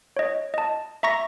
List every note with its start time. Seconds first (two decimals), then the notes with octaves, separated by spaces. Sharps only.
0.17 C#5 D#5
0.54 D#5 A5
1.03 E5 A#5 C#6 A#6